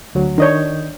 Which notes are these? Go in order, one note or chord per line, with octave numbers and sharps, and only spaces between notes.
D2 F#3
D#3 D4 C#5 D#5 G6